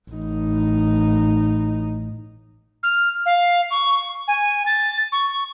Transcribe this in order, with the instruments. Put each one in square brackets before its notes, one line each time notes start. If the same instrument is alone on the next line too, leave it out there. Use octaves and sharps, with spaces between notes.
[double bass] A1 D#4
[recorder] F6
F5
C#6
G#5
A6
C#6